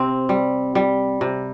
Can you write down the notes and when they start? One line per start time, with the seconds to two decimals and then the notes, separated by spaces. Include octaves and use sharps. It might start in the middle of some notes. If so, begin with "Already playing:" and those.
Already playing: C3 C4
0.29 G3
0.75 G3
1.21 C3